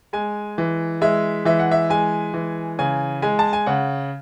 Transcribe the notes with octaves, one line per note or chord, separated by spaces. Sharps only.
G#3 G#5
E3
G#3 E5
E3 E5
F#5
E5
G#3 G#5
E3
C#3 G#5
G#3 G#5
A5
G#5
C#3 F#5